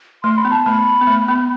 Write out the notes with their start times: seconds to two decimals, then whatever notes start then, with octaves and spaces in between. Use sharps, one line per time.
0.23 A3 C6
0.37 B5
0.45 B3
0.52 A5
0.66 A3 B5
1.01 B3
1.07 A3
1.28 B3